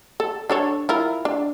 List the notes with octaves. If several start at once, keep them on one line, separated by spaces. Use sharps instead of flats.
A4
D4 A4 C#5
E4 F4 A#4
D4